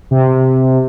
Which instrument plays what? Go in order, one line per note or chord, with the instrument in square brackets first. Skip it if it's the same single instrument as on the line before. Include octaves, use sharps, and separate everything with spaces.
[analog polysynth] C3